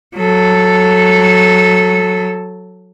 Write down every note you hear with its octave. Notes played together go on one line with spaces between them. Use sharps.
F#3 A4